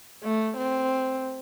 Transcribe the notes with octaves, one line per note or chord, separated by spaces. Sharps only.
A3
C4